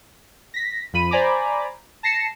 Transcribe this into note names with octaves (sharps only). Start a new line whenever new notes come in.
A#6 B6
F2 F3 B5 D#7
C5 D5 G#5 A#5 B5 D6
A5 A#6 C7 C#7 E7